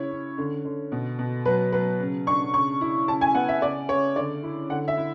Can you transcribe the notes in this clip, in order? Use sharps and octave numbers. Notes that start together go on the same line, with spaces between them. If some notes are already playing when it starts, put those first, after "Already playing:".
Already playing: C#3 E4 C#5
C#4
D3
D3
B2
B2
F#3 B4
F#3 B4
C#3
D4 C#6
C#3 C#6
E4
C#3 A5
G#5
B3 F#5
E5
C#3 D5
C#3 C#5
D3 D5
E4
D3 F#5
E5
E4